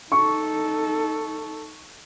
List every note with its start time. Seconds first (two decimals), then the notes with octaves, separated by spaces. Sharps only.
0.12 D#4 A4 C#6